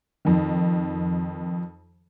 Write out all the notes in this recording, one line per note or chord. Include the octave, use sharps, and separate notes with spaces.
F2 D#3